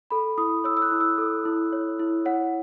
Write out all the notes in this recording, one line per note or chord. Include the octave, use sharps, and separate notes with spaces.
A4 B5
E4 D#6
C#5 E6
E6
F#6
E4
E6
A4
E4
C#5
E4
C#5 F#5